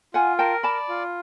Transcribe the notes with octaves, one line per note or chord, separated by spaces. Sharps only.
F4 F#5 G#5
A#4 G5 A5
D5 A5 B5
F4